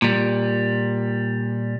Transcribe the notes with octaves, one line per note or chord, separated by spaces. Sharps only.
A#2 G3